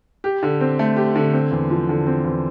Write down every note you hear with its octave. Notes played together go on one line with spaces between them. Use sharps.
G4
D3
C4
A3
G4
D3
C4
E2
F3
D3
C4
E2